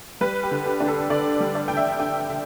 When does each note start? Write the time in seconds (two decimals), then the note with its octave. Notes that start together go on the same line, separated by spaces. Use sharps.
0.21 G3 B4
0.43 G4
0.51 D3
0.66 G4
0.80 D4
0.88 A4
1.10 D3 D5
1.40 G3
1.55 D5
1.68 D3 G5
1.77 E5
2.00 D4 G5
2.29 D3 E5